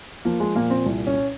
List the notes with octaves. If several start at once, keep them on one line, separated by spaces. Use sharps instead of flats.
F3 A#3
G#3
A#2 A#3
C4
C2
C#4